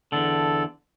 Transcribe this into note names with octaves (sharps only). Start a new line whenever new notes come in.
E2 D3 A4